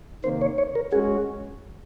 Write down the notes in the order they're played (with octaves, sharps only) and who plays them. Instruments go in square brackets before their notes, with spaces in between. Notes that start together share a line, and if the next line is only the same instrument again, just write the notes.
[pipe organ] C3 D#3 A#3 [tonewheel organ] C5
[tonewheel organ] C#5
C#5
A#4
[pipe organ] G#3 C#4 F#4 [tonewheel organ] G#4